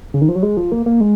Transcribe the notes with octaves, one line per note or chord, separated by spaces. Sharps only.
C#3
D#3
F3
F#3
G#3
F3
A#3
A#3
G#3